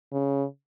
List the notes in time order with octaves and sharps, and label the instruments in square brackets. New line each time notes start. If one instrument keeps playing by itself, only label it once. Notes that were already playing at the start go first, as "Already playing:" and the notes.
[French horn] C#3